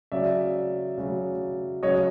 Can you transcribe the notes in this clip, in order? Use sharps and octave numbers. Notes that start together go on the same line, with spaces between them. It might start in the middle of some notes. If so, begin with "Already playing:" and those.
C#3 F#3 D5 E5
C#3 F#3
C#3 F#3 C#5 D#5